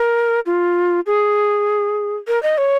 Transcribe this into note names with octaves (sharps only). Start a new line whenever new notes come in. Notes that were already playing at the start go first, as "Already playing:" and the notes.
Already playing: A#4
F4
G#4
A#4
D#5
C#5